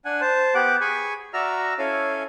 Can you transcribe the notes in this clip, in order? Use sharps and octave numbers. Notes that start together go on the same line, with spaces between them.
D4 F#5 G#5
C5 A5
B3 G4 F#5 D6
G#4 G#5 B5 C#6
F#4 D5 E5 A#5 E6 F6
C#4 E4 A4 C#5 F5 G#5